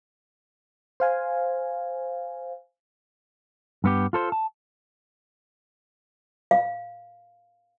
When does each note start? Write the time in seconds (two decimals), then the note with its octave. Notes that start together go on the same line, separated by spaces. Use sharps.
1.00 C5 F5 G#5
3.84 G2 B3 G4
4.13 F4 A4 C5
4.32 A5
6.51 F5